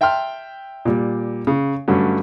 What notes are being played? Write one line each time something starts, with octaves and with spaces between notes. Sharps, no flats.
E5 G5 A5 C6 F6
A#2 G3
C#3
G2 D3 F#3 A3 C#4